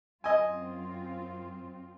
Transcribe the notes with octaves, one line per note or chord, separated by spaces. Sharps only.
F#2 C4 F4 D#5 G#5